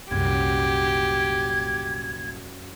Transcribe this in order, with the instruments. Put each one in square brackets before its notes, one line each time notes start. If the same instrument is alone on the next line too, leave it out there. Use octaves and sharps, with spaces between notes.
[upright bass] C2 A#2 [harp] F#2 [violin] G4 [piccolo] G#6